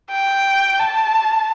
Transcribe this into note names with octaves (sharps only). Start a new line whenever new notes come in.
G5
A5